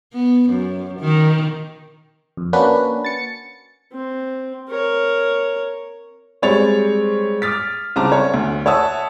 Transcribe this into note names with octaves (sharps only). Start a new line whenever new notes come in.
B3
F#2
D#3
F2
A#3 C#4 D4 F#4 B4
A6 C#7
C4
A#4 C#5
G3 G#3 C4 C#5 A6 F7
D6 D#6 F6 A6 B6
C2 C#3 C4 A5 A#5 D6
C#5
D2
C#5 E5 F#5 A5 D#6 E6